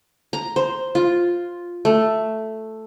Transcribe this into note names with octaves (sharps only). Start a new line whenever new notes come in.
A#5
C5
F4
A3